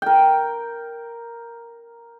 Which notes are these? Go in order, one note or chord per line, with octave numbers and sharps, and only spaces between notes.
A#4 G5